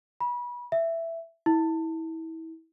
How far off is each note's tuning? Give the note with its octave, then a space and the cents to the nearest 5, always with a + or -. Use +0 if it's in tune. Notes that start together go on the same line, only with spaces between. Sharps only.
B5 -30
E5 +10
E4 -30